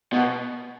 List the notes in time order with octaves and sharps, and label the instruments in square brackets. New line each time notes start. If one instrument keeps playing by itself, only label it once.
[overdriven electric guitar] B2